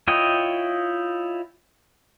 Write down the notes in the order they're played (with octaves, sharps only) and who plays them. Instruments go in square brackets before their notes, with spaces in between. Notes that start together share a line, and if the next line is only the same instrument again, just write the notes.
[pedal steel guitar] E4 F4 C#5 D#5 G5